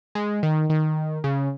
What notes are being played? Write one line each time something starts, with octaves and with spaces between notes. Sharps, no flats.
G#3
D#3
D#3
C#3